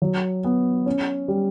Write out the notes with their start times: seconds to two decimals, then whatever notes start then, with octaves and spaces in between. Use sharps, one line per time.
0.02 F#3
0.44 B3
0.86 C#4
1.28 G3